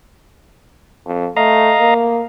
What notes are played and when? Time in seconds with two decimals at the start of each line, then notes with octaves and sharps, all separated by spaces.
1.07 F2
1.37 A3 D#5 F5 A#5
1.81 A#3